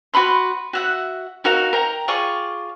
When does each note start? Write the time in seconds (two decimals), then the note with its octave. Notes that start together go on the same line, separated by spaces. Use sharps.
0.14 F#4 B4 B5 C6
0.73 F#4 E5 F#5
1.44 D#4 F#4 A#4 F5
1.73 A#4 G5 A#5
2.08 F4 G#4 D5 C#6